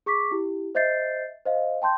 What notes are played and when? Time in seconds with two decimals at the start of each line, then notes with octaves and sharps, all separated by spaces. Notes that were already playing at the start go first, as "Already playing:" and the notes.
0.06 G#4 C#6 D6 B6
0.31 E4 G4
0.75 C5 D#5 E5 G6 A6 C7
1.46 C5 D#5 F5
1.82 G5 A5 C6 G6